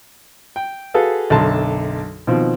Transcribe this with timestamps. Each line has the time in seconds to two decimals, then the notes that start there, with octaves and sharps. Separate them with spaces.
0.56 G5
0.94 F#4 G#4 A4 B4 F5
1.30 B1 F#2 D3 A5 C6
2.27 B2 D#3 F3 C4